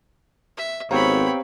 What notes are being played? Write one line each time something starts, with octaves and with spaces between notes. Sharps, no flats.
E5
G#1 B3 C4 G4 C#5 F5 A#5 B5